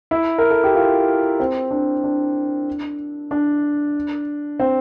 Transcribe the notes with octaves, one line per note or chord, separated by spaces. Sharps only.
E4
A#4
A4
G4
F4
C4
D4
D4
D4
C4